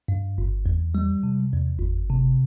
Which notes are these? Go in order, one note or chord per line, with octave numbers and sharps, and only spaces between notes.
G2
G1
E2
G3
C3
E2
G1
C3